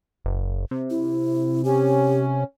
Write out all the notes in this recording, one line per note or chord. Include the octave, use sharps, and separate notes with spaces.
F#1
C3
E4
C#4 G4